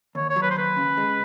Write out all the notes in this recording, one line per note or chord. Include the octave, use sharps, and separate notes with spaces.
D#2 C#5
C#5
F#3
B4
C5
D#2 B4
C#3
G#3